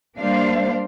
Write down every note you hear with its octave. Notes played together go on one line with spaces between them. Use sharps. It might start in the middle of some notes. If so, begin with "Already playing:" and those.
G3 A#3 D4 C5 F5